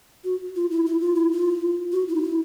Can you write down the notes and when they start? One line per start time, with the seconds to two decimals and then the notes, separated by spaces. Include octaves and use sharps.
0.24 F#4
0.56 F4
0.71 E4
0.86 E4
1.01 F4
1.16 E4
1.32 F4
1.92 F#4
2.08 E4
2.16 D#4
2.23 E4